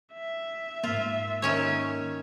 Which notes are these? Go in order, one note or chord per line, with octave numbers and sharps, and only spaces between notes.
E5
G#2 A#3 F4
D#3 C#4 C#5